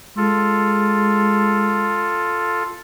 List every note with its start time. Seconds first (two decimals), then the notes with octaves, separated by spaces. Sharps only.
0.17 G#3 F4 A4